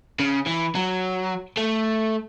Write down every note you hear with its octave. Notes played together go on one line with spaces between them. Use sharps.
C#3
E3
F#3
A3